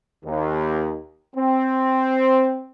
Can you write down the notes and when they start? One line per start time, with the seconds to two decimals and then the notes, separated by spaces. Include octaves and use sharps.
0.25 D#2
1.36 C4